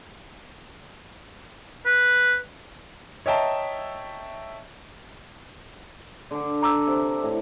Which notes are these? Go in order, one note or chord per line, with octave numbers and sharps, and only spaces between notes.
B4
C#5 D#5 E5 G5 A5 A#5
D3 D4
A#5 D6 E6
C3
A2